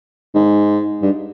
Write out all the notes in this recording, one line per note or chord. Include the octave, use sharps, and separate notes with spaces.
G#2
G2